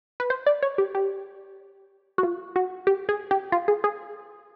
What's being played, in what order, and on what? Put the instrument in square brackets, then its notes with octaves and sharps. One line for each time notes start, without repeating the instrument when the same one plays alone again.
[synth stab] B4
C5
D5
C#5
G4
G4
F#4
F4
F#4
G4
G#4
G4
F4
G#4
G#4